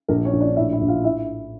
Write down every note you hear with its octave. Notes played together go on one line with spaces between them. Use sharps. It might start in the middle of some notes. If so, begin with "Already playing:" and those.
A#1 A#4
C#4 C#5
A#1
D4 D5
A2 E4 E5
E4 E5
A#1
F4 F5
E4 E5